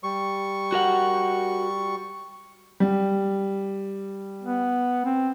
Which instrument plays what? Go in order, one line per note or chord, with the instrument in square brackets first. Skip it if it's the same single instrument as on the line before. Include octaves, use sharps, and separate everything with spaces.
[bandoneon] G3 C#6
[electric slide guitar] F#4 A#4 F#5
[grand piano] G3
[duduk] B3
C4